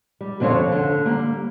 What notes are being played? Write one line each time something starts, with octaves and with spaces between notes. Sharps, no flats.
G3
F2 D3 C4 G#4 C#5 F5
D3
G3 A#3